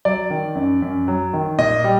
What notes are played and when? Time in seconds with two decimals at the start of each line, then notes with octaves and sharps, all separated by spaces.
0.05 F#3 D5
0.30 D#3
0.55 F#2
0.82 F#2
1.08 F#3
1.33 D#3
1.58 A#2 D#5
1.84 G3